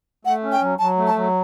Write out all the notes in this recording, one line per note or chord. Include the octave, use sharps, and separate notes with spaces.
A3 F#5
C#4
G5
F#3
F#3 A5
A3
A5
F#3